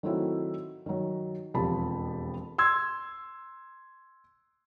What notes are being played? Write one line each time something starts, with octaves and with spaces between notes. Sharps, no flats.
D#3 F#3 A3 C4 E4 F#4
D#3 F#3
E1 F2 F3 G4 A5 B5
C6 E6 G#6